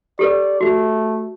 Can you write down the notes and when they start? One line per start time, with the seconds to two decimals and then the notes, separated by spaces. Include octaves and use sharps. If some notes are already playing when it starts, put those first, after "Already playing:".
0.19 G4 A4 B4 D5
0.61 A3 F#4